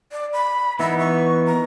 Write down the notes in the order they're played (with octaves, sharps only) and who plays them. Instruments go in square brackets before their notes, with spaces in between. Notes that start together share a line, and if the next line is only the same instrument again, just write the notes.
[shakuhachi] D5
B5
[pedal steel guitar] E3 B3 D#4 [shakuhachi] E5
[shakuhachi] C#6
A#5